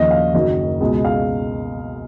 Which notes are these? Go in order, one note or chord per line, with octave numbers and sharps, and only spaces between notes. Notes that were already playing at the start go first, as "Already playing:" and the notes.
Already playing: D#2 C#3 F3 D#5
F5
F#1 F#2 D#3 F#3 D#5
C#2 B2 G#3
F5